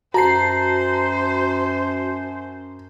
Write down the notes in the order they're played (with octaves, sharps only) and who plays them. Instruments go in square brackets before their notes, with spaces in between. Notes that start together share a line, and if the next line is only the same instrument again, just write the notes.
[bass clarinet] F#2 [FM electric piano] F#4 A5 C7 [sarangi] C5 [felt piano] A#5